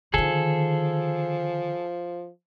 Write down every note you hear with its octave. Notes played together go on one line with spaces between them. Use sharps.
D3 D#3 F3 G#4 A4